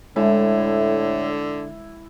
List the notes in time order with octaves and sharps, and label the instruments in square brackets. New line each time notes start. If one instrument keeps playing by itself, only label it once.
[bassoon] A2 [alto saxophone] D3 [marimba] G#3 [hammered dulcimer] E4